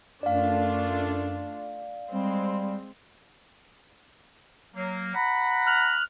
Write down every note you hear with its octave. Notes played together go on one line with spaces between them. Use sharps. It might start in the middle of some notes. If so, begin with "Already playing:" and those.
F#2 A3 D4 F4 D5 F5
G3 G#3 C4
F#3 A#3
F#5 A#5 B5
F6 F#6